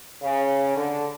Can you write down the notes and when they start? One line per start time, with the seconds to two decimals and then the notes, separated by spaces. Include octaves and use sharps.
0.23 C#3
0.77 D3